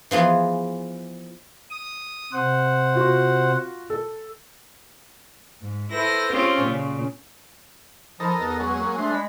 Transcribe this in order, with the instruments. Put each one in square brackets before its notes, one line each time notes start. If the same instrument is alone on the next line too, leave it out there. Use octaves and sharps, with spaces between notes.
[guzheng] E3 F3 B3 G#4
[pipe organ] D#6
C3 C5 F#5
[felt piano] F4 F#4
A4
[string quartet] G#2
E4 A4 B4 C5 A#6
C4 C#4 F4 G4 G#4 C#5
A#2 C#3
[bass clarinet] F3 [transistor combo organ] D#4 A4 A#4 [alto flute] B5
[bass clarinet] E2 [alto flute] B4
[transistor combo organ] F#3 G#3 C#4
[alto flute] A#3
[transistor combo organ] G#3 C5 [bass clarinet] A3 [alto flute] D4
[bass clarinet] G#3 [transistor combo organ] B5